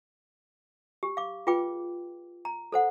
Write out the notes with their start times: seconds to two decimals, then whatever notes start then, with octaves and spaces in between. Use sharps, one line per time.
1.03 G4
1.17 F5 D6
1.47 F4 G#4 B4 G5 D6
2.45 A#5
2.72 A4 C5 F#5